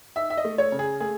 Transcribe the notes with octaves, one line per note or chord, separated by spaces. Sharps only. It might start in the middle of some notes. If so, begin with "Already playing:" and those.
D#4 E5
E5
D#5
A3
C#5
C#3
G#4
A3 G#4